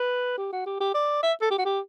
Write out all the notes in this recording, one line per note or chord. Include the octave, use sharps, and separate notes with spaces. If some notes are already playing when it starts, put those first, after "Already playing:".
Already playing: B4
G4
F#4
G4
G4
D5
E5
A4
G4
F#4
G4